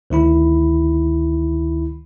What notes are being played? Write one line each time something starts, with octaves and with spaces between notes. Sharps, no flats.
D2 D#3 E4 B5